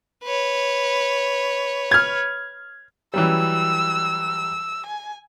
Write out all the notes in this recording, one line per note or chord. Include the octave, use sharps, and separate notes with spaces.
B4 C#5
F6 G#6
E3 F#3 G3 E6
G#5